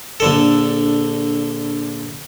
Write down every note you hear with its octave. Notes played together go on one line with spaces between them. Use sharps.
A#1 D3 A4